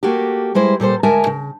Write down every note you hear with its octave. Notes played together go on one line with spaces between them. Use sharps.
A3 A#3 F#4 G4
G3 G#3 E4 C5
A#2 G3 A4 C5
D2 G#3 A#4 E5 G#5 A5
C#3